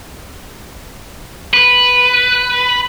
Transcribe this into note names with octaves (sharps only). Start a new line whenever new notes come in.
B4